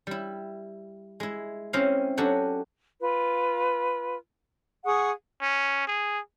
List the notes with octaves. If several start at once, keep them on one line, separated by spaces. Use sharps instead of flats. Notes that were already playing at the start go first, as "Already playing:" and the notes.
G3 E4
G#3 E4
C4 C#4 E4 C5 D#5 F5
F#3 C#4 D4 F#4 G4 A4
F4 B4
G#4 F#5 C#6 D#6
C#4
G#4